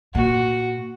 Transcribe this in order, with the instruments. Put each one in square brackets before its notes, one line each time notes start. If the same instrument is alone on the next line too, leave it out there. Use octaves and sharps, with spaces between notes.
[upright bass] A#2 [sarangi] F#4